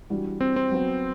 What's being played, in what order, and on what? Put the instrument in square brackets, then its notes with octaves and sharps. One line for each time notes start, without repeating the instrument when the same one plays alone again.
[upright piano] E3 G3 D4 F#4
[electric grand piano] C4
C4
[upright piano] F#3 B3 F#4